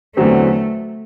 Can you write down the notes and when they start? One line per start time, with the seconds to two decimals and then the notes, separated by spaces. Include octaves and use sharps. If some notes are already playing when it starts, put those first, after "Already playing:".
0.16 E2 D3 F#3 A3 C4